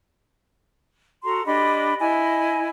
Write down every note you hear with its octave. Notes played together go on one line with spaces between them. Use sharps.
F#4 A4 A#5 C6
D4 G4 D#5 B5
E4 D#5 G#5